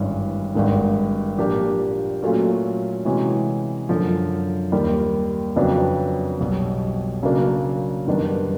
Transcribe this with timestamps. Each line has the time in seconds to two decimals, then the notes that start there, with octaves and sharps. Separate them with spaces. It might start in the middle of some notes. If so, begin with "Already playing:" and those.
Already playing: G#1 G2 E3 G#3 C#4
0.55 G#1 G2 D#3 G#3
1.38 A#2 F3 A#3 D4 G4
2.22 A#2 F#3 A3 C#4 F4
3.05 C3 E3 G#3 C#4 F#4
3.89 F#2 D3 F3
4.72 D#2 D#3 G3
5.56 F2 C#3 F#3 B3 D4
6.40 B1 B2 G3
7.23 C#3 F#3 A#3 D4
8.07 F#2 D#3 G3 B3 D4